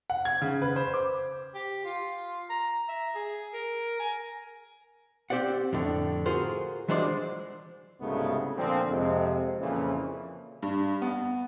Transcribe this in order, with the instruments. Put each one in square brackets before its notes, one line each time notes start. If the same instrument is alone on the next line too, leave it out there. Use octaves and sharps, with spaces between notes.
[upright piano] F#5
G#6
C#3
B4
C5
D6
[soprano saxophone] G4
F4
A#5
E5
G#4
A#4
G#5
[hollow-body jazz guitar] C4 G4 C5 D5 F#5
F2 A2 D3
F4 F#4 G#4 A#4 C5
E3 F#3 G#3 D4 C5 D5
[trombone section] C2 G#2 C#3 F#3 A3 B3
A#2 D3 F3 C4
F2 C3 G#3
F2 A#2 C#3 E3 F3
[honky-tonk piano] G2
B3